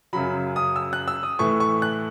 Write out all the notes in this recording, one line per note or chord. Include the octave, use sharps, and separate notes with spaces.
F#2 C#3 F#3 B5
D#6
E6
F#6
E6
D#6
A2 E3 A3 C#6
C#6
F#6